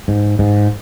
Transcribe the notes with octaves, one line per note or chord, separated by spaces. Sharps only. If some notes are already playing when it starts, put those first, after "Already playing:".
G#2
G#2